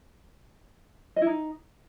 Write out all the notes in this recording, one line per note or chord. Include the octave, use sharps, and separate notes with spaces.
D#5
E4
D#4